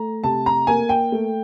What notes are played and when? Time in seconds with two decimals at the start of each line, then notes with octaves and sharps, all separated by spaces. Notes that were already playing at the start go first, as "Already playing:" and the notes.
Already playing: A3 A#5
0.24 C3 A5
0.46 A#5
0.67 A#3 G#5
0.89 G5
1.12 A3